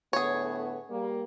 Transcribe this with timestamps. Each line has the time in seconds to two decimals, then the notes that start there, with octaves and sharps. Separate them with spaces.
0.13 A2 D3 B3 G#4 C#5
0.90 G3 A#3